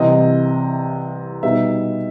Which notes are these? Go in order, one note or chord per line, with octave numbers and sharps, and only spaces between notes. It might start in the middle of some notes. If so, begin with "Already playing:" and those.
Already playing: C2 C3 E3 D#5
B2 G3 B3 D#4 E5